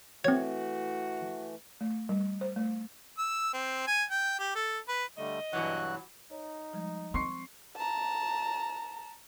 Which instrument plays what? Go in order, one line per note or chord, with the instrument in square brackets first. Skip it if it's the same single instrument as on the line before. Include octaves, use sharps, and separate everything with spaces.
[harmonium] E3 A3 [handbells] C4 G#6 [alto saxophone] F#4 [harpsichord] C#5
[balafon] A3
G3
C5
A3
[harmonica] E6
C4
G#5
G5
G4
A4
B4
[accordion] D3 G3 A3 [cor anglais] D#5
[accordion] G2 F#4 F#6 [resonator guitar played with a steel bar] B2 E3 F#3
[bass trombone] D#4 [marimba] C#5
[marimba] F3 G3 G#3
[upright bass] C4 [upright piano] C6 C#6 C7
[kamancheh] A5 A#5